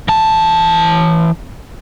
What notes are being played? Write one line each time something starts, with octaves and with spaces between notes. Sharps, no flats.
E3 A5